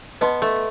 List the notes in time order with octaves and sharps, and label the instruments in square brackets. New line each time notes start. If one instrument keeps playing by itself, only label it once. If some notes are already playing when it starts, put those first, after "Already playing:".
[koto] B3 [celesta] B4 D#5 A5 C6
[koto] A3